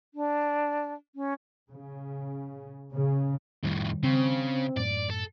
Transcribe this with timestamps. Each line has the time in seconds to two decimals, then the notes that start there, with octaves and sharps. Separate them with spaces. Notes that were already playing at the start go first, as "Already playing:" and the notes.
0.14 D4
1.15 C#4
1.71 C#3
2.93 C#3
3.63 F2 A2 D#3 G3
4.03 C#3 C4
4.77 F#2 A2 D5
5.10 A4